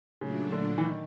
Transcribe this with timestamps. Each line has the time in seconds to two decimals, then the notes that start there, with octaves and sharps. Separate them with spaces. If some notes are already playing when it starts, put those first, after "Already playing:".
0.21 A#2 C#3 F#3 A3 D4
0.52 D3
0.78 E3
0.85 D#3